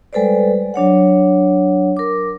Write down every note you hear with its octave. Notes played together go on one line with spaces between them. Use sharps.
G3 G#3 A4 B4 C5 D5
F#3 D4 C#5 F#5
A#4 D6